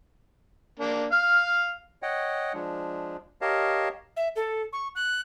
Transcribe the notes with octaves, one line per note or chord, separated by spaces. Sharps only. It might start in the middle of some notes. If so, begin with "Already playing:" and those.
A#3 D4
F5 F6
C#5 D#5 F#5 G5
F3 G#3 D4
G4 A#4 C#5 D#5 F5 A5
E5
A4
C#6
F#6